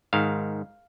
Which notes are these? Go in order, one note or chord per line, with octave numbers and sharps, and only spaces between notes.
G#2 D#3 F5